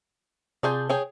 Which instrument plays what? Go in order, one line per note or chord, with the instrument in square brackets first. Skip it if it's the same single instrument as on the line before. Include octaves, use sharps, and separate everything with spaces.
[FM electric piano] C3 A5 G6 [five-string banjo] F4 G#4 D5
[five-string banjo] G#4 C#5 G5